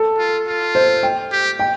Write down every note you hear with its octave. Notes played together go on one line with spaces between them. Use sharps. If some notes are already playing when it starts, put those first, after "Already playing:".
Already playing: A4
F4
F4
C5
G5
G4
G5